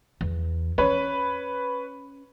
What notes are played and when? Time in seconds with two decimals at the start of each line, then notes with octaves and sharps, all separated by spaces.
0.21 E2
0.78 C#4 B4 C#5